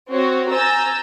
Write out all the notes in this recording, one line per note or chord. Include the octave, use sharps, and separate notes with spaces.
C4 F#4 C#5
G#5 A#5 E6 G6 A6